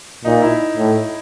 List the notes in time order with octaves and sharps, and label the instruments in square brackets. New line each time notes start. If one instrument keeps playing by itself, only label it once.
[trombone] A#2 [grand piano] D#4
[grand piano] E4
[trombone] A2